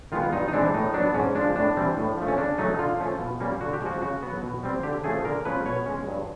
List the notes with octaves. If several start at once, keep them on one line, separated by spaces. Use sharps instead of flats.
D#3 G#3 B3 F4
G2 D#4
D#4
E3 G#3 C4 D4
A2 D#4
F#3 B3 D4
G#2 C#4
F3 G#3 D4
A2 D4
E3 G3 C4
A2
F3 A3
C#4
C#3 D4
F#3 A3 C#4 D#4
D3 F4
F3 A3 C#4
B2
G3 A#3 C#4
D3 F#4
G4
F3 G#3 F#4
C#3 F#4
F#3 B3
B2
G3 C4
D3 G4
F3 A3 C#4 G#4
D3 A#4
F3 G#3 C#4 B4
B2 C#5
G#3 C#4
G2